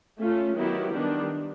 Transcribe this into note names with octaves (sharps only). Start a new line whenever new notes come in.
A3 C#4 F4
D#3 F#3 B3 E4 G4
D#3 G3 B3 D4